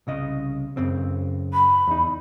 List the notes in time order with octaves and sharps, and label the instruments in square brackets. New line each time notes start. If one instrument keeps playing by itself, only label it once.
[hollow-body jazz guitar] C2 C#3 D#5
F#2 C#3 C4
[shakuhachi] B5
[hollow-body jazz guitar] E2 D#4